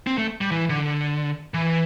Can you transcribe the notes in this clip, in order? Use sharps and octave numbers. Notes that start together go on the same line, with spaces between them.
C4
A3
G3
E3
D3
E3